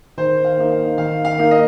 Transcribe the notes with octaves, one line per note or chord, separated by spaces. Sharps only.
D#3 C5
F5
A#3 D#4
F5
D#3 F5
F5
A#3 D#4
D#5